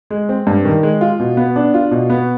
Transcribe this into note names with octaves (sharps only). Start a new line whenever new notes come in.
G#3
C4
G2
D#3
G#3
F4
B2
B3
D4
F4
B2
B3